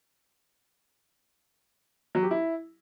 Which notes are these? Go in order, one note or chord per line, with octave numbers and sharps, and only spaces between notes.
F#3
G4
E4